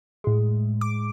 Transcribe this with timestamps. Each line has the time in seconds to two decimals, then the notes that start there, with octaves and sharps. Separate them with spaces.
0.24 A2 G#3
0.81 D6